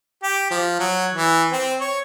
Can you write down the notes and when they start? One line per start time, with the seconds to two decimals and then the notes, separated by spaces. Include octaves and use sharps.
0.23 G4
0.51 F3
0.79 F#3
1.13 E3
1.53 C4
1.81 C#5